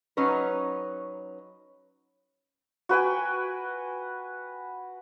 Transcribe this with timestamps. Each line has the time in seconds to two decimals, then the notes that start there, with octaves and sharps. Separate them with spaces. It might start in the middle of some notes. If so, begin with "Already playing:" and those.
0.17 F#3 C#4 D#4 B4
2.89 F#4 B4 G5 G#5